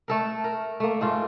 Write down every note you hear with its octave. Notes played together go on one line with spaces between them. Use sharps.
A3 A4 A#4
A#4
A3 A#3
G#2 A3 F4